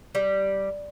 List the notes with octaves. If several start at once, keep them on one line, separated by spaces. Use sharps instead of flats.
G3